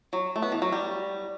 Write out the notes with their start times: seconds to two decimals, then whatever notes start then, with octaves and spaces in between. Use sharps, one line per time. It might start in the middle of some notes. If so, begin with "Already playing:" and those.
0.13 F#3
0.36 A3
0.42 B3
0.52 E3
0.62 F#3
0.72 G3